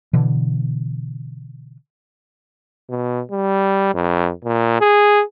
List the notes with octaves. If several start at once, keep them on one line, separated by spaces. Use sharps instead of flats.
B2 D3 E3
B2
G3
F2
A#2
G#4